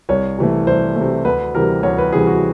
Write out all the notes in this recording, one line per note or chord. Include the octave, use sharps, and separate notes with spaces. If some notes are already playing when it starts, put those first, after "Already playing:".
C2 C#5
C3 E3 A3
C2 C5
C3 E3 A3
D2 B4
C3 E3 G3 A#4
D2 C#5
B4
C3 E3 G3 G#4
F#4